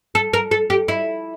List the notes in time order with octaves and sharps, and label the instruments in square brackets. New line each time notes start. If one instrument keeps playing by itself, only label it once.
[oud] A4
A#4
A4
G4
E4